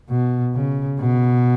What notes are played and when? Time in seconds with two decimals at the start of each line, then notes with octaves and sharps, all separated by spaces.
0.10 B2
0.55 C#3
1.00 B2